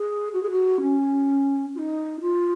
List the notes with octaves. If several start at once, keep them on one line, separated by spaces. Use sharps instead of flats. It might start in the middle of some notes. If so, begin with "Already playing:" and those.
Already playing: G#4
F#4
G#4
F#4
C#4
F4
D#4
F4